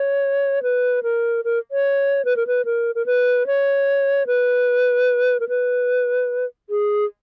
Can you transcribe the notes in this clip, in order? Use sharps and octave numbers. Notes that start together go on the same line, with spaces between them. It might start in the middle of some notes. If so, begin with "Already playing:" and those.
Already playing: C#5
B4
A#4
A#4
C#5
B4
A#4
B4
A#4
A#4
B4
C#5
B4
A#4
B4
G#4